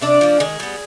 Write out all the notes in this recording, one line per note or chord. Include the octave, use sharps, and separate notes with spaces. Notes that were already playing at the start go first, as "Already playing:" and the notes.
C3 D4 D5
F3 A#3
D#3 G#3 G#4
G3 B3